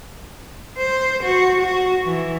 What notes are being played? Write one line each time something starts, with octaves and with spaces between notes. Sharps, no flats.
C5
F#4
F#4
E3